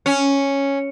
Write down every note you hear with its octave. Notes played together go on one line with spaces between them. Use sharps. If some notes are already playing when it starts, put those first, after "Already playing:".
C#4